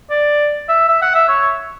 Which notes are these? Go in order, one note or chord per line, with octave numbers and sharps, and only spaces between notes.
D5
E5
E5
F#5
E5
C#5